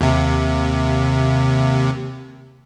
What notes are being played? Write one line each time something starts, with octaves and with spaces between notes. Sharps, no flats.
D#2 C3